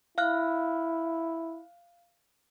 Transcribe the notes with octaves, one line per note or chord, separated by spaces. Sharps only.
E4 F5 F6 F#6